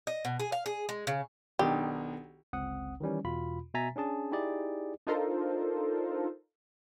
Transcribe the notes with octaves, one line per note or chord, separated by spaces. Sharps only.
D#5
B2
G#4
F5
G#4
G#3
C#3
B1 D#3 D4 G4
G1 C#2 C4 F#5 D#6
D#3 E3 G3 C#4
E2 B2 F4 B5
B2 E5 G#5 A#5 A6 B6
C#4 D4 G#4 A5
D#4 E4 G4 G#4 D5
D4 D#4 F4 A4 A#4 C5